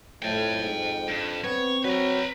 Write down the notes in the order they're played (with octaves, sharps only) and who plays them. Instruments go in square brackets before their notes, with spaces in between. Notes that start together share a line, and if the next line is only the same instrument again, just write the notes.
[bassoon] F2 [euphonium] A2 [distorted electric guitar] G5 A5
[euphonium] G#2
[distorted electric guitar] G2
[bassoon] B3 [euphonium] C4 [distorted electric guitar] C#5
[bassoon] F#3 [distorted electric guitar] B4 A#5